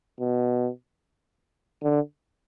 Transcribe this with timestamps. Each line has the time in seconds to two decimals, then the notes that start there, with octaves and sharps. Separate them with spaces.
0.20 B2
1.83 D3